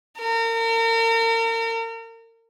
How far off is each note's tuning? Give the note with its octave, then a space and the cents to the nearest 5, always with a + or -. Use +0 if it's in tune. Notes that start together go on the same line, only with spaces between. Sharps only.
A#4 -35